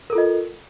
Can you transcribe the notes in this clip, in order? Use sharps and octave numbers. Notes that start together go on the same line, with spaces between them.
F4 A4 A#4 D#5